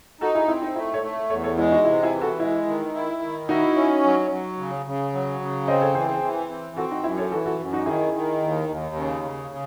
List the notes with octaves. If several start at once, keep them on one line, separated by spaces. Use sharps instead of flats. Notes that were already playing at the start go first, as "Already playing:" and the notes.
D#4 F#4 A4
E4 G#4
C4 E4
D#4
A3 E4
A4 C#5
A3
E2 A4 C#5
A4 C#5
G#3 E4
D#4 F#4
C3 E4
E4 G#4
E3
F#4 A4
G#3 E4
D#3
E4
D#3
D#4 E4 F#4
C#4
F#3
F#3
C#3
C#3
F#3
C#3
C4 C5 D#5
A4 C#5
E3 G#4 C5
G#4 C5
E3
C4
C4 F#4 A4
D#4 F#4
F#2 E4
A4 C#5
E3 F#4 A4
F#4 A4
F#2
D#4 F#4
D#3 E4 G#4
D#3
D#2
D#2
C#3
C#3
C#3